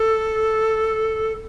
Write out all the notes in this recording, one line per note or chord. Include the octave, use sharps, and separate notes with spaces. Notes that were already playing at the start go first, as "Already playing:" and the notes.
Already playing: A4